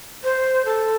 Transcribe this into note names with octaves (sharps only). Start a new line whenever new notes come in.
C5
A4